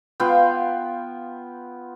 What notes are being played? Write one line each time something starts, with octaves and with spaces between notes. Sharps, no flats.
B3 F4 F5 G5